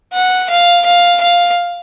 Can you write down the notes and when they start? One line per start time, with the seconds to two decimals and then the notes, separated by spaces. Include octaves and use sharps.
0.13 F#5
0.50 F5
0.85 F5
1.21 F5